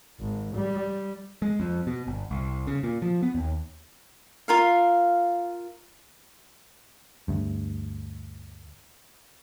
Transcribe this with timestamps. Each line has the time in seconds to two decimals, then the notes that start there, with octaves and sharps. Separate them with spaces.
0.20 G#1
0.55 G3
1.42 G#3
1.60 F2
1.87 B2
2.07 G1
2.31 C2
2.67 C#3
2.83 A#2
3.02 F3
3.23 B3
3.35 D#2
4.48 F4 A#4 F5
7.28 D2 G2